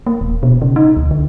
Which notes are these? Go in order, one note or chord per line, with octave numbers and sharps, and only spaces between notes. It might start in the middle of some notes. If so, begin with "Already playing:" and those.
A#3
D#1
B2
C#3
D#4
D2
D3